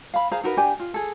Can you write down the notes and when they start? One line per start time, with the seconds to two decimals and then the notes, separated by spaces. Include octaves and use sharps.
0.14 F5 B5
0.31 G#4 C5 F5 A#5
0.44 D#4 F#4 A#4 B4
0.57 D4 G4 G5 G#5
0.80 F4
0.94 G#4 A4